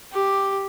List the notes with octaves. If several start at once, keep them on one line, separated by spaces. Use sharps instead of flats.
G4